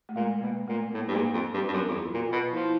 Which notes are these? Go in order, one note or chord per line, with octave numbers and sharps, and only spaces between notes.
A3
A#2 G#3
B2 A#3
A#2 A3
B3
A2 A#3
G2
G#2 A#3
F2 C4
G2
G2
F#2 B3
F2
E2
F4
A#2 F#4
F4
B2
F3 E4